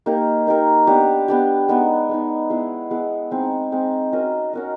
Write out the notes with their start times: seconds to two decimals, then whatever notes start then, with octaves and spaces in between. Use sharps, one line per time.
0.06 A#3 D#4 G4 A#4
0.47 A#3 D#4 G4 A#4
0.87 B3 D4 G4
1.28 B3 D4 G4
1.68 G#3 B3 D#4
2.09 G#3 B3 D#4
2.50 G#3 B3 E4 G#4
2.91 G#3 B3 E4 G#4
3.31 G#3 C4 D#4
3.72 G#3 C4 D#4
4.12 C#4 F#4 A#4 D#5
4.53 C#4 F#4 A#4 D#5